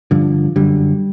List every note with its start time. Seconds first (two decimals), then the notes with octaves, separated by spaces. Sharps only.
0.11 G2 D3 F3
0.56 F#2 D3 G3